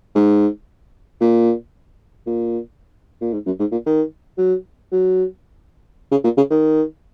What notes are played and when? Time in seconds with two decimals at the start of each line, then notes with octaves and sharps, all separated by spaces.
0.15 G#2
1.21 A#2
2.27 A#2
3.21 A#2
3.33 G#2
3.46 F#2
3.60 G#2
3.72 A#2
3.86 D#3
4.38 F#3
4.92 F#3
6.11 C#3
6.24 A#2
6.37 C#3
6.50 D#3